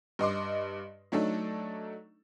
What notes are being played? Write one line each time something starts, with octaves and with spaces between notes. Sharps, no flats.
G2 D#5 C6 D6
F#3 A3 D4 D#4 A4